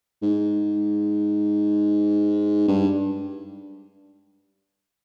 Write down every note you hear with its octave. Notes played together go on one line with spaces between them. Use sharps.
G#2
G2